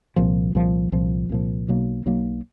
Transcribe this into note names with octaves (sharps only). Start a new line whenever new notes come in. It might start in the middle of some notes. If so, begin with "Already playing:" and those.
C2 A#2 F3
C2 A#2 F3
C2 A#2 F3
C2 A#2 F3
B1 B2 F#3 A#3
B1 B2 F#3 A#3